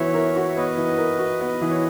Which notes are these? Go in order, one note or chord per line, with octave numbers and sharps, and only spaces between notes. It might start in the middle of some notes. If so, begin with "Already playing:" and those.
Already playing: E3 B3 F#4 C#5 E5
A#4
F#4
E5
B3 B4 D#5
E3
A#4
F#4
B3
E3
C#5